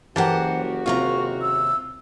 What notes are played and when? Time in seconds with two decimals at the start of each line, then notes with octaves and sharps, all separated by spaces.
0.16 F#1 E3 F#4 G4 A#4 C5 F#5 A5
0.86 D#2 C3 F4 A#5 C#6
1.42 E6